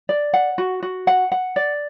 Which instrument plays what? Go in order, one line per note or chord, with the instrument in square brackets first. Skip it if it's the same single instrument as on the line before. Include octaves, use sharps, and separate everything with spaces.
[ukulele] D5
F#5
F#4
F#4
F#5
F#5
D5